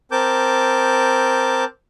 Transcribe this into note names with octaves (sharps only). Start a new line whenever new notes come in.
C4 A#4 A5 D6 G6